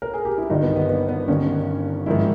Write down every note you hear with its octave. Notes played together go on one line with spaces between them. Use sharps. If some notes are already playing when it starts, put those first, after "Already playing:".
A#4
G#4
G4
E4
G1 G2 D#3 D#4
B3
B3
B3
B3
G1 G2 D#3 C#4
A#1 G#2 D#3 E4